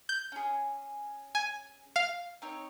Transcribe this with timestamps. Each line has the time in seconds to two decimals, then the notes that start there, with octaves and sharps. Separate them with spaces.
0.09 G6
0.32 C#4 G#4
1.35 G#5
1.96 F5
2.42 C4 D#4 C#5